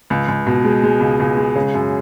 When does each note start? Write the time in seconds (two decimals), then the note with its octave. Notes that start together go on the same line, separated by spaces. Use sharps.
0.10 C#2
0.28 C#2
0.47 B2
0.64 G#3
0.84 G#3
1.01 C#2
1.20 C#2
1.37 G#3
1.56 C#3
1.74 F#2